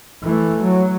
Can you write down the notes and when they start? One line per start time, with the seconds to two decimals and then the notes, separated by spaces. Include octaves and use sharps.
0.24 E3 A3
0.63 F#3